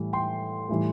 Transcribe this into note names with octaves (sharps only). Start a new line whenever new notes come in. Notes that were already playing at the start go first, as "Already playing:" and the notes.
Already playing: A2 E3 G3
G5 C6
A2 E3 G3